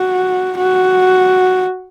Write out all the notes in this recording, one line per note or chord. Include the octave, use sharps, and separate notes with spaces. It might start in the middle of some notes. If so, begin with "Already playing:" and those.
Already playing: F#4
F#4